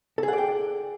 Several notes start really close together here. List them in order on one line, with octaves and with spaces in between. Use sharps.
A4 G#4 F#5 D5 G5